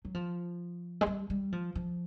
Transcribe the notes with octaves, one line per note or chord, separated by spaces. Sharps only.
F#3
F3
G#3
G3
G3
F3
F3